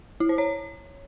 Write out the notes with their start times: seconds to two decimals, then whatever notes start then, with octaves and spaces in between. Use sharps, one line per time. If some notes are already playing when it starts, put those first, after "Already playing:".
0.20 E4
0.29 C5
0.38 C#5